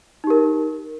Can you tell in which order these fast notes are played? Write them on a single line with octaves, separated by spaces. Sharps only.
D#4 G4 A#4